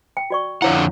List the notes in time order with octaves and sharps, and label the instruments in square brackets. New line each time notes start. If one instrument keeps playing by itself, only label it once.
[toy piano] G5
F#4 D5 C#6
[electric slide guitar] F2 D3 F#5 [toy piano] E4 C#5 F5